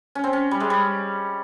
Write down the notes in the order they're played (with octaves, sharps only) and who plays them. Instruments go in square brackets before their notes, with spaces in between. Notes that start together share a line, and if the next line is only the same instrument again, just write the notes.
[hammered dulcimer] C#4
C4
C#4
G3
G#3
G3